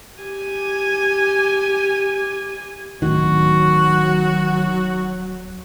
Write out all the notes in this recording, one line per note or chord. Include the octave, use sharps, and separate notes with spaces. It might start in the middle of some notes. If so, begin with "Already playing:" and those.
G4 G#5
D1 D#3 F#3 F#4